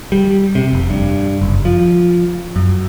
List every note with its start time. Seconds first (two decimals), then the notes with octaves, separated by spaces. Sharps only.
0.12 G3
0.55 C3
0.73 F1
0.90 G2
1.42 F#1
1.65 F3
2.56 F#2